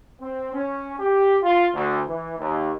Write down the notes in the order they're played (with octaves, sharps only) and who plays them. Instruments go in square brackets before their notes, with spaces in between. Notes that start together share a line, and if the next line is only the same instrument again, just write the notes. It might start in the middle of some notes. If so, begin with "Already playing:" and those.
[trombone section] C4
C#4
G4
F4
D2
E3
D#2